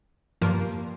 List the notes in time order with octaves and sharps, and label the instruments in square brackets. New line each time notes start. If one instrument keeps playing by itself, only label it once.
[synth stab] G2 F3 A#3